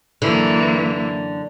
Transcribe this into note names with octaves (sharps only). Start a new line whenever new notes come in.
F#2 D3 E3 A#3